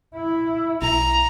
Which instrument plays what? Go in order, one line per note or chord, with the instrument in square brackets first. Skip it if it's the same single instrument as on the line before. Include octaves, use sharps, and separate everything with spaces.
[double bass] E4
[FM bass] B1 [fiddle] A#5